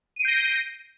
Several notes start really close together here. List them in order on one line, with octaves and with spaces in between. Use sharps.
D#7 D7 C7 G6 A#6